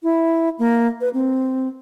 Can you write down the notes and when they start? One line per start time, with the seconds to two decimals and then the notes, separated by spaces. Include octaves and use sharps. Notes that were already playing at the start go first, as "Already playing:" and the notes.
0.03 E4
0.59 A#3
1.01 B4
1.14 C4